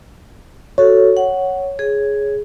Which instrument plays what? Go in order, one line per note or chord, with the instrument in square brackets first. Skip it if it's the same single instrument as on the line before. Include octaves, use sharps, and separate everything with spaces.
[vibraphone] F#4 A4 [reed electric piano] C#5
[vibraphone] F#5
G#4